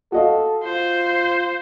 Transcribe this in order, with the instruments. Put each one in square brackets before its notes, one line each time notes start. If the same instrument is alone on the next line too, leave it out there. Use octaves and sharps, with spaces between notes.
[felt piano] F#4 D#5 F5 [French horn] A4
[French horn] F4 [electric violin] C5